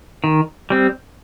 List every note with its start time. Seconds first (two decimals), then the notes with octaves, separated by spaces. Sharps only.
0.24 D#3
0.70 G3 C4